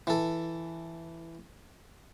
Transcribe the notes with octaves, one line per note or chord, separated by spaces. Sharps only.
E3 A4